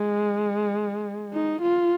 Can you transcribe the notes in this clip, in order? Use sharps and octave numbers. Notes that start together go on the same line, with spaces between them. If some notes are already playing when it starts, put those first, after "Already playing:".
Already playing: G#3
D#4
F4